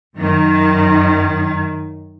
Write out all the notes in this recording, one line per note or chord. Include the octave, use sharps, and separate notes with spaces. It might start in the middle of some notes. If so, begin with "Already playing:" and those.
F#2 D#3